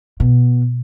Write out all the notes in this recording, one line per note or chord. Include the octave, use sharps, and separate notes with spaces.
B2